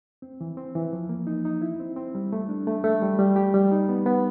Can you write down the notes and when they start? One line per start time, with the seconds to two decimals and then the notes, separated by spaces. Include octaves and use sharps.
0.22 C4
0.41 E3
0.57 C4
0.75 E3
0.93 F3
1.09 A#3
1.27 D#4
1.45 D#4
1.62 E4
1.80 C4
1.96 C4
2.15 G3
2.33 A3
2.49 D4
2.67 A3
2.84 A3
3.02 G3
3.19 G3
3.36 G4
3.54 G3
3.72 D#4
3.89 B3
4.06 B3